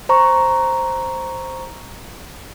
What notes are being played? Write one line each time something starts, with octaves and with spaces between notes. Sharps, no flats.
C5 A#5 C#6